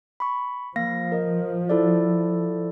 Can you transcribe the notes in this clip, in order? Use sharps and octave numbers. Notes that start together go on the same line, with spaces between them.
B5 C#6
F3 A#3 F5 A#6
A#4 D#5
E4 A4 D5